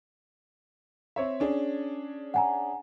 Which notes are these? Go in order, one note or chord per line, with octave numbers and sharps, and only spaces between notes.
C4 C#5 E5
C#4 D4 G#4
F#5 G#5 A#5